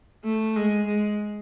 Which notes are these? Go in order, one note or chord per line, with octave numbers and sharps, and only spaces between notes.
A3
G#3
G#3